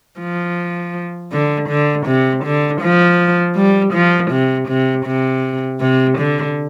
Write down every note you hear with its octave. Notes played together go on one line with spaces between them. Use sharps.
F3
D3
D3
C3
D3
F3
G3
F3
C3
C3
C3
C3
D3